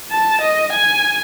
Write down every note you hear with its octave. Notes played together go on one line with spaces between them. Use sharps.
A5
D#5
G#5